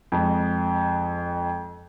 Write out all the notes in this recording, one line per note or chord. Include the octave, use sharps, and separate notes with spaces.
F2 G#3